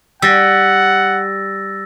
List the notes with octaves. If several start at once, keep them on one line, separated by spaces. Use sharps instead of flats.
G3 F#5 E6 A6 A#6